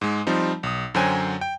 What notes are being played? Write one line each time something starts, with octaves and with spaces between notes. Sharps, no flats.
G#2 G#3
F3 G3 C4 D#4
B1 D#6
F#2 D3 F#3 C5 G5 G#5
G5